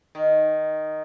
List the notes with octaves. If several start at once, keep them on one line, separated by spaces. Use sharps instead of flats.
D#3